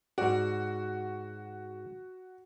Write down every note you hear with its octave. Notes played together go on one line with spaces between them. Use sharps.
G#2 F#4 D5